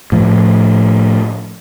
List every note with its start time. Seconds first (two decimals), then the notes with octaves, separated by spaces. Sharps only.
0.12 A2 F3